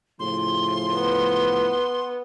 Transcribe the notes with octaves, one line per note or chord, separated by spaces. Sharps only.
A2 C#3 F3 C6
B3